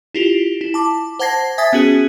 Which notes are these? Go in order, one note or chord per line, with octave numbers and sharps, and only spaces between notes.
E4 F4 G4
E4
A5 D6
C5 F#5 A5 G#6 A#6 C7
E5 G#5 D#6 G#6 A6 B6
B3 C#4 F#4 G#4